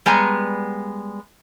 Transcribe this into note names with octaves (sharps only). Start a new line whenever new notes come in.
G3 G#3 B3 G#5 A#5